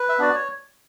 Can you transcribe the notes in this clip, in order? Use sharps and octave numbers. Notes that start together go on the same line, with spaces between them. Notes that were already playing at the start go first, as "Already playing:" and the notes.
Already playing: B4
E5
B3 D4 F#4 D5
C#5